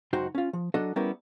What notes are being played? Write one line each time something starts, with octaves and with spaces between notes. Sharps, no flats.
C#2 F#2 D#4 F#4 C5 G5
C#4 F4
F3
F#3 D4 F#4 A4 D#5
G3 B3 C#4 E4 G4 A#4